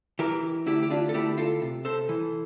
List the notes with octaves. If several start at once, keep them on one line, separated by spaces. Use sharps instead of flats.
E3 G4 A#4
D2 E4 G4
G4
D4 F4
A4
D2 E4 G4
F4 A4
C3
A4 C5
E3